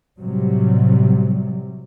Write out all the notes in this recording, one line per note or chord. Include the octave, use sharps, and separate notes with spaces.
A2 C3 F#3 G3